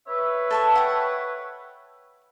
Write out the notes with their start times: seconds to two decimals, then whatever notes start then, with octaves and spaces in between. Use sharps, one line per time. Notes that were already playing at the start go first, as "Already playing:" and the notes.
0.08 B4 C#5 E5
0.51 A4 A5 C#6
0.75 F#5 G5